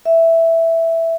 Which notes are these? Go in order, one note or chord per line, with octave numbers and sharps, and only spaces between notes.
E5